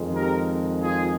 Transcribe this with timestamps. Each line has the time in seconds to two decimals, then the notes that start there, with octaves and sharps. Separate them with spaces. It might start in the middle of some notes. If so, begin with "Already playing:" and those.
Already playing: F2 D#3 G#3
0.13 G4 A#4
0.78 F4 G#4